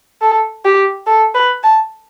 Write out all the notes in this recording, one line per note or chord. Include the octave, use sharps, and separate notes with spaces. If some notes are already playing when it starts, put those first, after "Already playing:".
A4
G4
A4
B4
A5